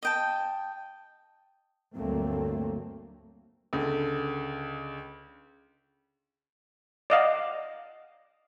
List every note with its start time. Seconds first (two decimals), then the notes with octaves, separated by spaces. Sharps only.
0.03 D#5 G5 A5
1.95 D2 G2 F#3 A3 A#3 C4
3.73 C#2 D3
7.10 D5 D#5 F5 F#5